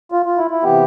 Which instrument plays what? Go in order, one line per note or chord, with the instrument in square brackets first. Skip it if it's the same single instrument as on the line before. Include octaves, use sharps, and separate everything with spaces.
[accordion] F4
F4
E4
E4
C3 E3 B3 G4